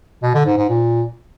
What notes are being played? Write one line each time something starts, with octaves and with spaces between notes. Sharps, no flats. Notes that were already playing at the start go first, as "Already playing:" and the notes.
B2
D3
G#2
G#2
A#2